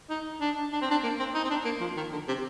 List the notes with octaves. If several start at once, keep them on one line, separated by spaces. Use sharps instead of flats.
D#4
D4
D4
C4
D4
A#3
C4
D#4
C4
D4
A#3
F3
D#3
D3
C3